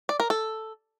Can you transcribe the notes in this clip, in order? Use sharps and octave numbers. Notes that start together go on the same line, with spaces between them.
D5
A#4
A4